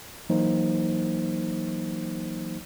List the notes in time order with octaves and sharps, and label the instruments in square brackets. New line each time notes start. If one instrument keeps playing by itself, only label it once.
[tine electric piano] E3 F#3 A#3 D#4 C5